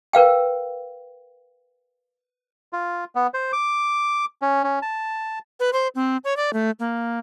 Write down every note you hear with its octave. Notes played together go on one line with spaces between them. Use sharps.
A#4 B4 F5 G5
F4
B3
C5
D6
C#4
C#4
A5
B4
C5
C4
C#5
D5
A3
A#3